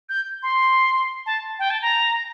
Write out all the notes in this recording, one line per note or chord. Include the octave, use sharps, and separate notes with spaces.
G6
C6
A5
G5
A5
A#5